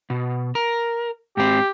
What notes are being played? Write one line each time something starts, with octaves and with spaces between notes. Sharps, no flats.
B2
A#4
G#2 C4 G4